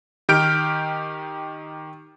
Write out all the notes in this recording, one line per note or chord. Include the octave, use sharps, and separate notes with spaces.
D#3 G4 F6 G6 D7